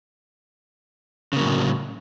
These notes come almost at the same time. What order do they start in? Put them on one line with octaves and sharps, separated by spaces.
C#3 A#3 F#3 A2